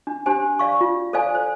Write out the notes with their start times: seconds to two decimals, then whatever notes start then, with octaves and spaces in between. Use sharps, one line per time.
0.07 D4
0.26 D4 G4 C5 G#5
0.59 D5 F5 C#6
0.81 F4
1.13 A4 C5 D5 F5 G#5
1.35 C5